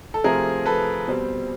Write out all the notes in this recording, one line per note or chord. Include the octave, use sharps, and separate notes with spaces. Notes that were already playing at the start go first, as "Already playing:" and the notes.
A4
C3 F3 A3 C4 G#4 A#4
A4 B4
B2 G3 C4